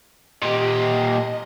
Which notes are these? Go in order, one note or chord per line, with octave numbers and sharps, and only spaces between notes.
A#2 G4 D#5